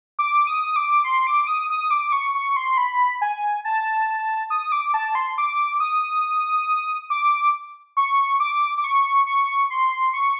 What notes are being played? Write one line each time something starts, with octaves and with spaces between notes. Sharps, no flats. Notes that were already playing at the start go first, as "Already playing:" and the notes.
D6
D#6
D6
C6
D6
D#6
D#6
D6
C#6
C#6
C6
B5
G#5
A5
D#6
D6
A5
C6
D6
D#6
D6
C#6
D6
D6
C#6
C#6
C6
C#6